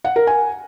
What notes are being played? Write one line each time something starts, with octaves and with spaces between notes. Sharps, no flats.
F#5
A#4
G#5